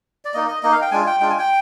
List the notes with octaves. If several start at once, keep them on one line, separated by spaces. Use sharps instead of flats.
D5
A#3 D#4 D#5
D#5
A#3 D#4 D#5
F5
G5
G#3 D4 F4 G#5
G5
G#3 D4 F4 G5
G#5
G5